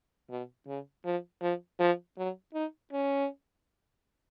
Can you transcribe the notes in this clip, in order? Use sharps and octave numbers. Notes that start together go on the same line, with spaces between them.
B2
C#3
F3
F3
F3
F#3
D#4
C#4